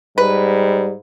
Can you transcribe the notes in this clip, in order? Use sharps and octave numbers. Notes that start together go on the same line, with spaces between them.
G#2 G3 B4